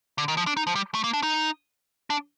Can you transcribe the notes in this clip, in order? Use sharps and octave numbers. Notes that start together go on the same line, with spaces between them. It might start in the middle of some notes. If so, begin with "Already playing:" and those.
D3
D#3
F3
D4
D#4
F3
G3
A3
A#3
D4
D#4
D4